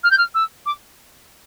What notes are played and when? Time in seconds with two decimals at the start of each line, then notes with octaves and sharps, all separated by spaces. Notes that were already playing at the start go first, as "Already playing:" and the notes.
0.04 F6
0.11 G6
0.18 F6
0.35 E6
0.66 D6